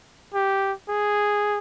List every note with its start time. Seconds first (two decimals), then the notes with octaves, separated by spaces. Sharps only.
0.34 G4
0.89 G#4